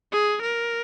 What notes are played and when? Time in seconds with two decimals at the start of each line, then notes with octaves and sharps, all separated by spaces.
0.12 G#4
0.42 A#4